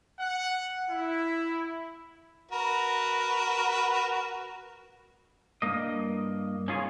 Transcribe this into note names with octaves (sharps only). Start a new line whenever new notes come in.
F#5
E4
F#4 A#4 B4
G2 A#3 D#5
C#4 D#4 F4 G#4 C#5